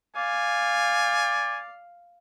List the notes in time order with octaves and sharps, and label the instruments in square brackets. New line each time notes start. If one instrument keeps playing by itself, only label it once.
[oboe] D5 [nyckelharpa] F5 [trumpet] G#5